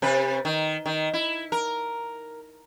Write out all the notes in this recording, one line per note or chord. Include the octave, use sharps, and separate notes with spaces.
C3 B4
D#3
D#3
E4
A#4